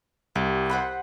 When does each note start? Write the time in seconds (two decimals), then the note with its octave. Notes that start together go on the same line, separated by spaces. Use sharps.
0.36 C2 G4
0.70 C5 F#5 B5